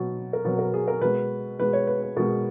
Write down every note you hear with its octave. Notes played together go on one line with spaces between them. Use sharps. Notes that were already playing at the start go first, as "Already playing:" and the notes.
Already playing: B2 F#3
A#4
B2 F#3 B4
A#4
G#4
A#4
B2 G#3 B4
B2 G#3 B4
C#5
B4
B4
B2 G#3 A#4